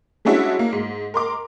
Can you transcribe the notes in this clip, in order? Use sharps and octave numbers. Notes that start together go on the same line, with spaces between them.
G3 G#3 C#4 D4 E4 F#4
A#3
G#2
A#4 C6 D6